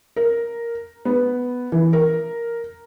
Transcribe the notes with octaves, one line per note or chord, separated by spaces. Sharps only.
A#4
B3
E3
A#4